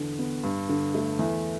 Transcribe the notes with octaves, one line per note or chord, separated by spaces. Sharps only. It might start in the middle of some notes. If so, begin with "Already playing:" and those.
Already playing: E2 D3
B3
G2
D3
A3
E2 E5